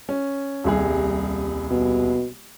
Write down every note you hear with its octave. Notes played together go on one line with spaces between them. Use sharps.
C#4
D#1 C2 G#4
B2